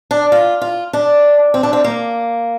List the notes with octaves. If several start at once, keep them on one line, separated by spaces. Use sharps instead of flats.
D4
F4
F4
D4
C4
D4
C4
A#3